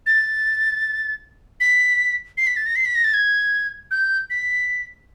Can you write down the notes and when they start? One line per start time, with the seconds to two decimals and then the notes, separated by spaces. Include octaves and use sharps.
0.06 A6
1.60 B6
2.37 C7
2.47 B6
2.57 A6
2.66 A#6
2.76 C7
2.85 B6
2.95 A#6
3.04 A6
3.14 G#6
3.91 G6
4.30 B6